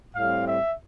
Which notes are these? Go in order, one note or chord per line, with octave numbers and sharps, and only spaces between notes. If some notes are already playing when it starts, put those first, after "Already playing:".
A2 G3 C4 F5
E5